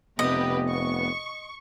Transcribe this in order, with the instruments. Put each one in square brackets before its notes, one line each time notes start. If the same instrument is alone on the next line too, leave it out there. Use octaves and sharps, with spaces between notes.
[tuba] F1 [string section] C3 G4 B4 [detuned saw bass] B3 [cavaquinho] D#5
[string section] C#6